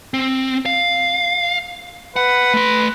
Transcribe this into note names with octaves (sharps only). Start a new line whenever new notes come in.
C4
F5
B4 F#5
A3 C6